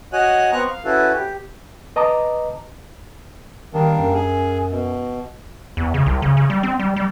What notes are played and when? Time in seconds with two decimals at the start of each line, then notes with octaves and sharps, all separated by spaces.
0.13 F#4 C#5 D#5 F#5 G#5 F#6
0.52 B3 C4 A#5 C#6 F#6
0.70 F5
0.85 C#4 E4 F#4 A4 B4
1.13 G4
1.96 B4 D#5 A5 A#5 D6 D#6
3.74 D#3 G3 A#3 D4
3.99 F#2
4.14 G#4
4.71 B2
5.77 E2
5.94 C#3
6.06 C2
6.22 C#3
6.37 C#3
6.50 G3
6.63 C4
6.79 G3
6.96 G3